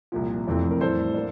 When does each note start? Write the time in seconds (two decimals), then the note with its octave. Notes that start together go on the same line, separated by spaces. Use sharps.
0.12 C2 A#2 F3
0.47 F1 F2 E3 A3 C4
0.71 A#4
0.80 A2 E3 G3 A4 C5
1.14 A#3 D4